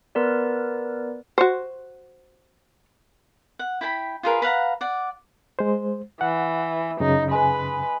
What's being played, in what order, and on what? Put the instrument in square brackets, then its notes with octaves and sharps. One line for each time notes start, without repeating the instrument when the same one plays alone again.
[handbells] B3 A#4 B4 D5
[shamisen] F#4 C5
[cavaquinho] F#5
E4 G5 A5 B5
F4 G#4 A#4 B4
B4 F5 F#5 A#5
D5 F#5
[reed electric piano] G#3 C5
[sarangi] E3 [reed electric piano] F#5
[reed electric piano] F#2 C#3 [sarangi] D#4
[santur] G#3 [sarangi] B4